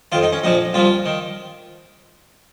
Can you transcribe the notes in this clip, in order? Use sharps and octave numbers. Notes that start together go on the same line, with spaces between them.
F2 D#3 F4
D#4
C#4
A#1 A#2 F3 D#4
C2 A#2 F3 F4
D#3